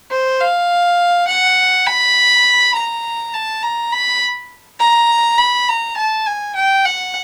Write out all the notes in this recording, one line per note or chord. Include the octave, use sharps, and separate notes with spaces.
C5
F5
F#5
B5
A#5
A5
A#5
B5
A#5
B5
A#5
A5
G#5
G5
F#5